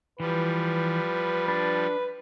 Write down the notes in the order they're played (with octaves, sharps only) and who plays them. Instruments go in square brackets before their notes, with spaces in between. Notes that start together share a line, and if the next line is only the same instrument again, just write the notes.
[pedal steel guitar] E3 [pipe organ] F3 G3 [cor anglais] B4
[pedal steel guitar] D4 [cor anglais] B4